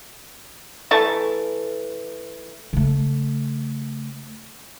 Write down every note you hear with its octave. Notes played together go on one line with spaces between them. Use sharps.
E3 A3 A5 C#6
C#3 A3